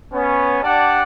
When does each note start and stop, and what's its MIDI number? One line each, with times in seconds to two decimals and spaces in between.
0.13 0.59 59
0.13 0.59 61
0.63 1.02 62
0.63 1.02 67
0.63 1.02 74
0.63 1.02 78
0.63 1.02 81